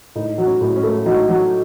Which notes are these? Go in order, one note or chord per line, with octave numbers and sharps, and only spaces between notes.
A2 D#4
F#3
C#4
A2
C#4
A3
F#3 D#4
F#3